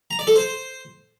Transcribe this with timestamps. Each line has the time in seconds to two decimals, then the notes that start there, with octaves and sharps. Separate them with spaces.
0.11 A#5
0.19 D5
0.27 A4
0.36 C5